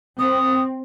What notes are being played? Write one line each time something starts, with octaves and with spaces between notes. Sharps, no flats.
C4 D#6